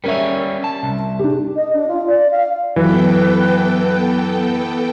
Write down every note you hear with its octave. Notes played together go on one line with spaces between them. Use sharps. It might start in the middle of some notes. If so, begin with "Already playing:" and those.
G3 C#4 A#4 C#5 E5
A5
C2
D4 G4
D#5
D4
F4
D5
F5
F#2 E3 F#3 B3 A4 B4 G5